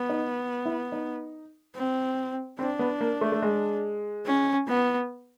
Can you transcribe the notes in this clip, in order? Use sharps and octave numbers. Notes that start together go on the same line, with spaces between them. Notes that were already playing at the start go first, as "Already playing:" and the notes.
Already playing: B3
D#4
E4
D#4
C4
C4 D4
B3
A#3
A3
A3
G#3
C#4
B3